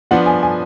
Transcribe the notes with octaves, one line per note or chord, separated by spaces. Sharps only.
F3 B3 D4 F#5
G#5
G#5